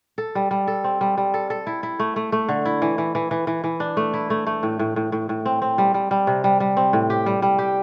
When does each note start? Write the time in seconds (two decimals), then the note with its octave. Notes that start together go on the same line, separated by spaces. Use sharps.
0.18 A4
0.35 G3
0.51 G3
0.67 A4
0.84 C4
1.01 G3
1.18 G3
1.34 A4
1.50 A4
1.67 E4
1.83 E4
1.99 A3
2.16 A3
2.32 A3
2.49 D3
2.65 E4
2.82 E3
2.98 E3
3.15 E3
3.31 E3
3.47 E3
3.64 E3
3.80 D4
3.97 A3
4.14 E4
4.30 A3
4.47 A3
4.63 A2
4.79 A2
4.96 A2
5.12 A2
5.29 A2
5.45 C4
5.62 C4
5.78 G3
5.94 G3
6.11 G3
6.27 C3
6.44 G3
6.60 G3
6.77 C4
6.93 A2
7.10 G4
7.26 G3
7.42 G3
7.59 G4